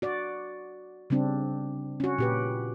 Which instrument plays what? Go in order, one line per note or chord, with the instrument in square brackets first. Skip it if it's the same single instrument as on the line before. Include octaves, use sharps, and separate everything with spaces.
[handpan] F#4 D5
C#3 G3 C4 D4
C#4 F#4
A#2 G4 B4